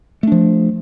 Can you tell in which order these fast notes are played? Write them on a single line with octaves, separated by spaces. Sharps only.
A3 D4 F3